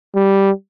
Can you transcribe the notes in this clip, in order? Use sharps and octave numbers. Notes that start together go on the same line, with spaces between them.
G3